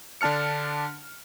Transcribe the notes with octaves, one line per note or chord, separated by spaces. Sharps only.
D3 D4 A5 F6 C#7